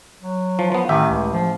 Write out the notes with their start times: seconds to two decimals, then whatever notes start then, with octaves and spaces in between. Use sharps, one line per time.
0.23 F#3
0.59 F3
0.72 F3 B3
0.89 A1 D#3 G4 E5
1.09 C#2
1.33 F3